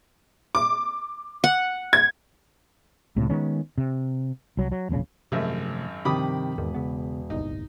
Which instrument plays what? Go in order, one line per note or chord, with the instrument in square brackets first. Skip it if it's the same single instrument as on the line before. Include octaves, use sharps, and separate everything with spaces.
[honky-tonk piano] D6
[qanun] F#5
[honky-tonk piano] G#6
[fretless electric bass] C#2 A2 C3
D#3 G#3 B3 C#4
C3
C2 F#3
F#3
E1 A#1 A2 C#3
[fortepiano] G#1 F#2 E5 [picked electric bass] C3 F3 A3
[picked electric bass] G2 F3 [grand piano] C3 D#3 [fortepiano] B5 D6 D#6
[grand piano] E1 [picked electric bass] E2 G#2 D#3
[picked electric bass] C#3 B3
[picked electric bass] D1 G1 C2 [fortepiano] D#4